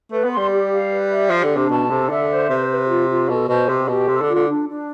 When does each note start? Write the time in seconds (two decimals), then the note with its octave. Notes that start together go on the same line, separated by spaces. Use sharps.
0.11 A3 B4
0.24 B3
0.31 C6
0.37 G3
0.50 G4
0.70 F5
0.90 B4
1.10 E5
1.30 F3 G4
1.43 D3
1.50 D4
1.56 C3
1.69 B2 A5
1.89 C3 A4
2.09 D3 E5
2.29 C5
2.49 C3 B4
2.69 B4
2.88 F4
3.09 F4
3.29 B2 A4
3.48 B2 C5
3.68 C3 G4
3.88 B2 G4
4.08 C3 A4
4.22 D3
4.28 F4
4.34 D3
4.48 D4
4.67 D4